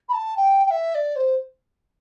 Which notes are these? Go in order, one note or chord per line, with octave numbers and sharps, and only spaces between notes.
B5
A5
G5
G5
E5
D5
C5